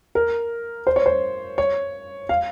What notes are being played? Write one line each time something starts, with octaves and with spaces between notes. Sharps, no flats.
A#4
C5
C#5
C5
C#5
F5